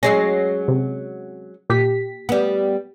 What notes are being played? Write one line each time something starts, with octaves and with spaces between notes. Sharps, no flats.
F#3 G#3 C#4 A#6 C7
C3
A#2 G4 B6
G3 B3